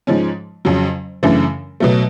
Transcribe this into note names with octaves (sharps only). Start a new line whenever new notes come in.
G#2 F3 G#3 C#4
F2 C#3 F#3
F#2 C#3 E3 A3 D4
B2 F#3 A3